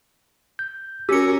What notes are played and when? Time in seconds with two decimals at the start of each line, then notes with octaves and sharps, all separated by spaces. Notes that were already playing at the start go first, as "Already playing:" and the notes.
0.59 G6
1.09 C#4 F#4 G4 A#4 E6 C#7